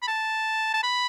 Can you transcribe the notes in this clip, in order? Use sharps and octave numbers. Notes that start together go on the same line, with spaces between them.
B5
A5
A5
B5